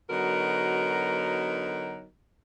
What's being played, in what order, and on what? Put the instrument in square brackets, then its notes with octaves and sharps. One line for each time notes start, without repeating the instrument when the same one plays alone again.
[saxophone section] D3 F#3 B3 D#4 F#4 A#4